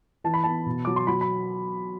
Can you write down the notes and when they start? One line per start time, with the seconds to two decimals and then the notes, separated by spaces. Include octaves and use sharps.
0.24 E3 A5
0.34 B5
0.44 B3 A5
0.66 B2
0.85 F#3 D6
0.96 C6
1.07 F#3 B5
1.21 B5